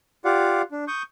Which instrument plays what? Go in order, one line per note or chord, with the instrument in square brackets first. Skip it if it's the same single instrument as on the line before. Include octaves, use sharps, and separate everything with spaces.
[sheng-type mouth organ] F4 G4 D5 F5 F#5
D4
C#6 D#6 G6